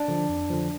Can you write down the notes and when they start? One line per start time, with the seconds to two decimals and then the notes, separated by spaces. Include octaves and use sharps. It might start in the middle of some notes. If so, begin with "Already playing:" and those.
Already playing: D4
0.08 D3 F3
0.29 F2
0.50 D3 F3